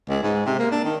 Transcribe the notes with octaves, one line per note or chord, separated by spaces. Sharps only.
C#2
G#2
C3
A#3
D4
D#3